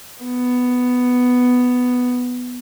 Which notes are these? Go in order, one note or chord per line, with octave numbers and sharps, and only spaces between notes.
B3